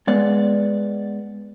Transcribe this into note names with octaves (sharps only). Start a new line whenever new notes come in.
G#3 B3 D5